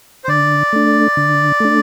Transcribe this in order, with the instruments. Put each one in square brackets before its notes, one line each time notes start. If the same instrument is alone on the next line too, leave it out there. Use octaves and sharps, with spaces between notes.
[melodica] C5
[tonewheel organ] D3 [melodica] D5
[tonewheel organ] A3 D4
D3
A3 D4